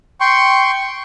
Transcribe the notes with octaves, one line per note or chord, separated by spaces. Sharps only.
G5 C6 C#6